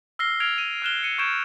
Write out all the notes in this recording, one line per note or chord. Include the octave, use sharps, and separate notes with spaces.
E6 F6 A#6 C7 G7
F6 G#6 D7 F7
D#7
F6 F#6 E7 G7
C#7 D#7
C#6 G6 G#6 D7 E7